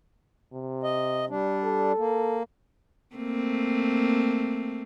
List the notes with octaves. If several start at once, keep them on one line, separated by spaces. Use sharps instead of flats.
C3
D#5
G3 D4
A4
A#3
A3 A#3 C4